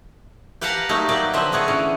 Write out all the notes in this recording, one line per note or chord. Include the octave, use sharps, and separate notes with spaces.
G4 B4 F5 F#5 A5 A#5
F#3 G3 A3 A#3 D#4 G4
F#3 A#3 B3 G4 D5
D3 F3 C4 B4 D#5 E5
A3 B3 G#4 C#5
D3 E3 C#4